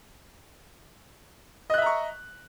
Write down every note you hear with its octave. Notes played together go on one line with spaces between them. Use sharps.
D#5 E5 A#5 C#6 F#6